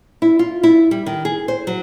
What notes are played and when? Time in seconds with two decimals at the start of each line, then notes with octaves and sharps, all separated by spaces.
0.22 E4
0.39 F4
0.63 E4
0.91 G3
1.06 D#3
1.25 G#4
1.48 C5
1.67 F#3